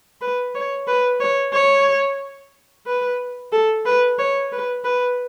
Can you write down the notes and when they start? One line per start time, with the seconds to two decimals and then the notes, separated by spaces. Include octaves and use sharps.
0.21 B4
0.55 C#5
0.87 B4
1.20 C#5
1.53 C#5
2.86 B4
3.52 A4
3.85 B4
4.19 C#5
4.52 B4
4.84 B4